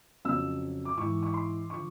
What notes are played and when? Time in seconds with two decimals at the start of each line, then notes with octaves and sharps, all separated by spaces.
0.25 F2 C#3 F#3 E6
0.85 D6
0.97 G#2 E3 C#6
1.23 C#6
1.34 C6
1.70 D3 F3 C#6